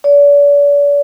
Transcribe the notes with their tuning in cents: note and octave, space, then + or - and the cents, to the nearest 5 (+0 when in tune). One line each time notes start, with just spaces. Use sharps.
D5 -40